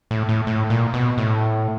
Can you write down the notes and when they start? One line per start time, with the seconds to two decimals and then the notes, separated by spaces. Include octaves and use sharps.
0.11 A2
0.29 A2
0.47 A2
0.70 A#2
0.94 B2
1.18 A2